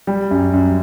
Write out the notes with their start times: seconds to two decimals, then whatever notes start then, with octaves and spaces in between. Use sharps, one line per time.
0.07 G3
0.31 F#2
0.53 F#2